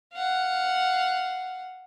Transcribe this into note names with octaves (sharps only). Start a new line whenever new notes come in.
F5 F#5